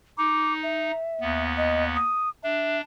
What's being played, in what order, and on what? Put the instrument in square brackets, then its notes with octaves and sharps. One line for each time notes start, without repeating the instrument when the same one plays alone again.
[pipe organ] D#4 [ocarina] D6
[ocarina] E5
[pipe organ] D#2 B3
[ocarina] D#5
D#6
[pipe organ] D4 [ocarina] E5